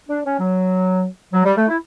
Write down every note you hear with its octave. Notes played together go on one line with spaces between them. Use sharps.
D4
C#4
F#3
F#3
G3
A3
E4